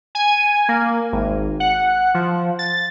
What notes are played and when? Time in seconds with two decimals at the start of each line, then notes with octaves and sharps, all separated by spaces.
0.15 G#5
0.69 A#3
1.12 G#1
1.60 F#5
2.14 F3
2.59 A6